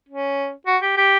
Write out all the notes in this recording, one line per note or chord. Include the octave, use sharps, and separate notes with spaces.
C#4
F#4
G4
G4